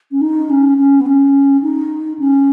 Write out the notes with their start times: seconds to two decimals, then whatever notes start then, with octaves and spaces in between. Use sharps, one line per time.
0.11 C#4
0.21 D#4
0.49 C#4
0.77 C#4
1.00 B3
1.06 C#4
1.62 D#4
2.19 C#4